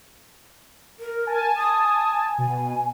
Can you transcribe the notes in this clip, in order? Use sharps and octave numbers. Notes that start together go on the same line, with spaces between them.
A#4
G#5 A5
D#6
B2 G#5